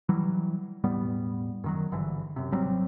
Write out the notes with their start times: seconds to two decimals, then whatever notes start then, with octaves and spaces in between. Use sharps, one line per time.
0.09 E3 F#3 G3
0.84 E1 A2 G3 B3
1.64 F#2 D#3 F#3
1.92 G#1 G2 D3 E3
2.36 F#2 C3
2.51 G#1 F#3 G3 C4